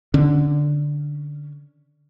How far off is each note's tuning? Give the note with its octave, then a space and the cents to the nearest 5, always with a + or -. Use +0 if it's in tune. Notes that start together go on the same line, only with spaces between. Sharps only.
D3 +0 C#4 +0